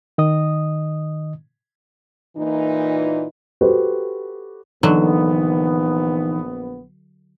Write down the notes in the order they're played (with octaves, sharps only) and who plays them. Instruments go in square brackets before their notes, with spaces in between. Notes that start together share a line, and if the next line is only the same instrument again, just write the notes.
[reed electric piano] D#3 D#5 D#6
[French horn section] A#2 E3 D#4
[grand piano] F#4 G4 A4 B4 C5
[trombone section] A#1 B3 [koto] D3 F#3 [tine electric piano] E3 D#4